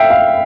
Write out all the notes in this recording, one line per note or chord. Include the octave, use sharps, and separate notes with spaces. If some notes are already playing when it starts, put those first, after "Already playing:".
Already playing: E5 F5 G5
F5